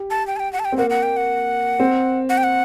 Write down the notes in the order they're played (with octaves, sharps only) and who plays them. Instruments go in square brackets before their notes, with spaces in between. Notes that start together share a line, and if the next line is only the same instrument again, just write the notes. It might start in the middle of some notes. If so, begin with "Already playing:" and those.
Already playing: [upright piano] G4
[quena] A5
G5
A5
G5
F#5
A5
G5
[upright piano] C4
[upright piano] A#3 [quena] F#5
[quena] F#5
G5
F#5
[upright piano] C4
[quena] F#5
G5
F#5